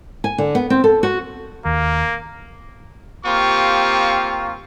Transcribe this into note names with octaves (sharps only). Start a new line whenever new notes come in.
G#5
D3
B3
C4
A4
F#4
D#2 A#3
A#3 C4 F4 G4 C#6